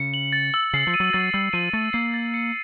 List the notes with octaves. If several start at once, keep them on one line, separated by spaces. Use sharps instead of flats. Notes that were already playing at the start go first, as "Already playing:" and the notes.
Already playing: C#3 C#7
F#7
A6
E6
C#3 C7
F3
D#7
F#3
F#3 A6
G3 E6
F3 D#7
A3 A6
A#3 C7
A6
C#7